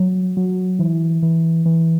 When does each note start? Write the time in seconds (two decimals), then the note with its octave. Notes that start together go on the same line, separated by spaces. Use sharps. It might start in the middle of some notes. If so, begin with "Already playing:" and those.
Already playing: F#3
0.37 F#3
0.79 E3
1.23 E3
1.66 E3